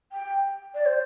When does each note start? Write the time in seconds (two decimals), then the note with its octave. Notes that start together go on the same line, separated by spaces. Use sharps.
0.12 G5
0.75 D5
0.86 C5